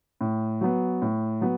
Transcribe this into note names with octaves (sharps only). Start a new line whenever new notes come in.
A2
F#3 B3
A2
F#3 B3